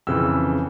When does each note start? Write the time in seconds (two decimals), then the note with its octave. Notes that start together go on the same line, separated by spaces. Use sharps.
0.07 F2 C#3 E3 E6